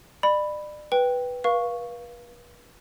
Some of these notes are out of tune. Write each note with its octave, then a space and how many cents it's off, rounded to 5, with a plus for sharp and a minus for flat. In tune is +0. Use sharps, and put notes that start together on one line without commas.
D5 +35 B5 +0
B4 +0 G5 +0
B4 -40 F5 -5 C#6 +0